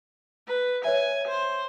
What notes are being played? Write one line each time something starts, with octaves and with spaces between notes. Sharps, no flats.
B4
B4 C#5 E5 G#5
C5